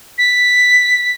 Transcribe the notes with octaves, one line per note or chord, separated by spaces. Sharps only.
B6